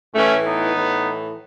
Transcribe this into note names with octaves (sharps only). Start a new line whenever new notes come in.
A2 E3 A3 C#4
B3 D#4
A2 E3